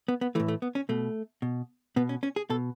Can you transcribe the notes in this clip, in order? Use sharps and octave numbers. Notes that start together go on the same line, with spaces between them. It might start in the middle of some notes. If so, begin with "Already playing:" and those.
B3
B3
A2 E3 A3
A3
B3
C#4
B2 A3
B2
B2 B3
C#4
C#4
G#4
B2 A4